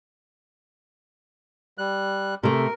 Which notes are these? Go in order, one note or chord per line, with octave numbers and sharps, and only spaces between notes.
G3 F#6
C3 A3 A#4